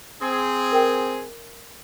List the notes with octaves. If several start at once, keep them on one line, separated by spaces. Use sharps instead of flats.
C4 G#4
A#4 G5